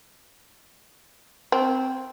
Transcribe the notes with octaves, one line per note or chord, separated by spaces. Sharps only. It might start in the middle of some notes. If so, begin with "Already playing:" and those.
C4